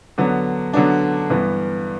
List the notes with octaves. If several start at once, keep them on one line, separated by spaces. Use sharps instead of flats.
D3 F#3 B3 D4
D3 F#3 B3 D4
G2 E3 B3